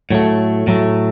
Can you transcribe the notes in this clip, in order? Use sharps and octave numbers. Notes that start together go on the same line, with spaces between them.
A2 F#3 A3
A2 F#3 A3